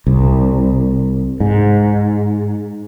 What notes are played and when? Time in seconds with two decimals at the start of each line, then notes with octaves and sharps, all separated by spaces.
0.07 C2
1.40 G#2